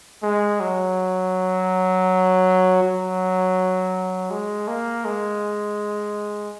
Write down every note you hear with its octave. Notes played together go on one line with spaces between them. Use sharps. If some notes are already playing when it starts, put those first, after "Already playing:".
G#3
F#3
F#3
G#3
A#3
G#3